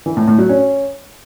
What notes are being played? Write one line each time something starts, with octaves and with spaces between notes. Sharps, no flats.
E3
A2
A2
F#3
C#4